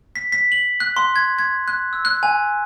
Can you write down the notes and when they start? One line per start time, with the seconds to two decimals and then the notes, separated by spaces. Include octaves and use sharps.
0.16 B6
0.32 B6
0.52 F#7
0.80 F#6
0.97 C6
1.16 G#6
1.39 G#6
1.68 F#6
1.93 E6
2.05 F#6
2.23 G#5